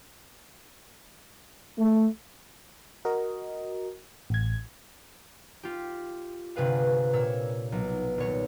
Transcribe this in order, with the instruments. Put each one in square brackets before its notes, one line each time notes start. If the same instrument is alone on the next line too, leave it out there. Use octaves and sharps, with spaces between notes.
[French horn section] A3
[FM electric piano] F#4 A#4 D#5
A1 G#6
[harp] F4 G4
G1 C3 G#4 B4 F5
A#2 C#5 E6 G#6
B1
D#1 C#5